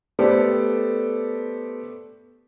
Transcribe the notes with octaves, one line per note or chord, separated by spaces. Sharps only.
A3 B3 G4 A4 C5 D5